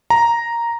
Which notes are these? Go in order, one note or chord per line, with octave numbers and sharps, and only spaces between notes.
A#5